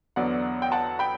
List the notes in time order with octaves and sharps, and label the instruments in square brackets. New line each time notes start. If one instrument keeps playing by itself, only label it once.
[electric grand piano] E2 D3 F#3 B3 [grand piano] D5 F#5
[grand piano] G5
F#5 A5
G5 B5